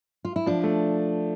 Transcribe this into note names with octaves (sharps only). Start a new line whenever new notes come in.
F4
E4
F3 D4
A3